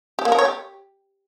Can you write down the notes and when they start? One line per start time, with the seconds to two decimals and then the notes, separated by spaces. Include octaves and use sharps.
0.19 G4
0.25 A#3
0.32 A#4
0.39 C#5
0.45 G4